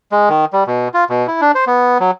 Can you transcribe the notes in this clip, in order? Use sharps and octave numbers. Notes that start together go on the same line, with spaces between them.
G#3
D#3
G3
B2
F4
B2
E4
D4
C5
B3
F#3